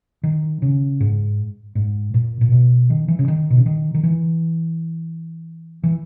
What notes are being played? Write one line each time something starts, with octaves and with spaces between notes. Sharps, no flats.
D#3
C#3
G#2
G#2
A#2
A#2
B2
D#3
E3
C#3
D#3
B2
C#3
D#3
D#3
E3
E3